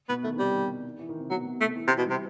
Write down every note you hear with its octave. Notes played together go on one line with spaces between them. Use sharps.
B2 B3
D#3 A3
C3 G3
D#3
E3
D#3
C3
B2 F#3
B2
C3 A3
E3
C3
E3
B2
C3 G3